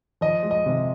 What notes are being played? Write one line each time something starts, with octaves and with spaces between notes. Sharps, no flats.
F3 D#5
G#3
D#5
C3